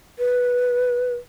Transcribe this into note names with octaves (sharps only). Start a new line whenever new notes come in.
B4